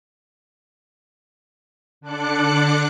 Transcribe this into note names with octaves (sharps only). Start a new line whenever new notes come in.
D3 D4 D6 F#6 C#7